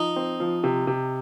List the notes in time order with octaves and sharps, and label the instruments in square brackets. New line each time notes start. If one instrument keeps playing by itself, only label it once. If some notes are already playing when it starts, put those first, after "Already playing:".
Already playing: [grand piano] F3 [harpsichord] D#4
[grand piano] C4
F3
C3
C3